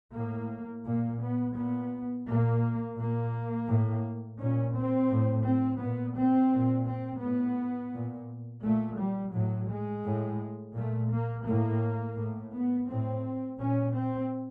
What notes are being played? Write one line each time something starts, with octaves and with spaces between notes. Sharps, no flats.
A2 A#3
A#2 A#3
B3
A#2 B3
A#2 A#3
A#2 A#3
A2
A#2 C#4
C4
A2
C4
A#2 B3
C4
A#2
C4
A2 B3
A#2
A#2 A3
G3
A2 F#3
G#3
A2
A#2 A3
A#3
A2 A#3
A2
B3
A2 C4
A#2 C#4
C4